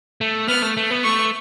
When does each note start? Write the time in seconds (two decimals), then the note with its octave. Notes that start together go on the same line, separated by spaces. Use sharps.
0.21 A3
0.48 B3 F6
0.62 A3
0.77 A3
0.91 B3
1.04 A3 C#6